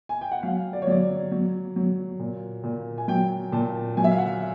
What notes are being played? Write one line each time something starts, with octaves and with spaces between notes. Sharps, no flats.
G#5
G5
F#5
F#3 F5
D5
C#5
F#3 D5
F#3
F#3
A#2
A#2
G#5
F#3 G5
A#2 A5
F#3 G#5
E5
F5
F#5